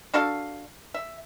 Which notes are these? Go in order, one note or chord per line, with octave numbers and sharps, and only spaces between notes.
D4 F#4 A4 F5
E5